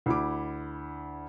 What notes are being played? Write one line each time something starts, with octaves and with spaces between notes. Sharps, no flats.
D2 E4 D6